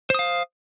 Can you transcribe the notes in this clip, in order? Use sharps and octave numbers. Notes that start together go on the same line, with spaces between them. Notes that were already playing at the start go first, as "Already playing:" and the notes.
C5 F5 D#6